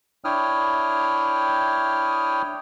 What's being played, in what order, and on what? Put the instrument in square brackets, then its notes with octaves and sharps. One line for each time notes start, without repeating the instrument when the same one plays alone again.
[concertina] D4 E4 C#5 G5 D#6 F6